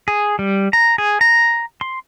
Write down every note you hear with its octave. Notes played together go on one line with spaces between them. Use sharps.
G#4
G3
A#5
G#4
A#5
C6